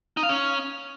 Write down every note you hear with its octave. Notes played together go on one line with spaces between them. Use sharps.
D#4
F5
C#4